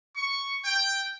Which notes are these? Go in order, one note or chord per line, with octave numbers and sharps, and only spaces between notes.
C#6
G5